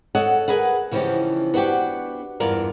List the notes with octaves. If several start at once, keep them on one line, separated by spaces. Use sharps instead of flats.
A4 C#5 D#5 F#5
G#4 A#4 B4 F#5
C#3 E3 F3 C#4 D#4 G4
B3 D4 F#4 G4
E2 G2 F4 A#4 D5